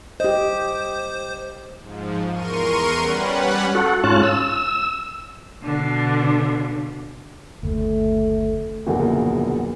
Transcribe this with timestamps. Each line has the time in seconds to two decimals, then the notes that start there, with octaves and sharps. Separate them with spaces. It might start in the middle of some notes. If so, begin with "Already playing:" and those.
0.20 G4 C5 D#5
1.80 G#2 F3
2.32 E2 A#4 C6 C#6 D#7
2.97 G3 C#4 B4 F#5
3.75 F#4 A4 F#5
4.03 G#2 C#4 F4 A5 F#6
4.23 E6
5.63 B2 D3
7.63 F#1 D2 A3
8.87 F#1 E2 A#2 D3 F3 F#3